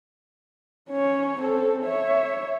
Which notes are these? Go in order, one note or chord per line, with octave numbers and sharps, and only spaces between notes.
C#4 C#5
C4 A4
C#5 E5